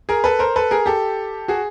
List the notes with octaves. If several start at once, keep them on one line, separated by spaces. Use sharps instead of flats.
G#4 A#4
A4 B4
A#4 C5
A4 B4
G#4 A#4
G4 A4
F#4 G#4